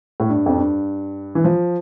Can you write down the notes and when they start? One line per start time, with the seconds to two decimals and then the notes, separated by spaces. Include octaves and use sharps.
0.20 A2
0.29 G2
0.46 F2
0.57 G2
1.35 E3
1.44 F3